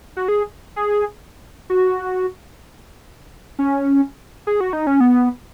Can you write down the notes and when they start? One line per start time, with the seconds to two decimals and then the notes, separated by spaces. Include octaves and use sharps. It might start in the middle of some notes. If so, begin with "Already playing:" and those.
0.17 F#4
0.28 G#4
0.76 G#4
1.70 F#4
3.59 C#4
4.47 G#4
4.60 F#4
4.73 D#4
4.87 C#4
5.00 B3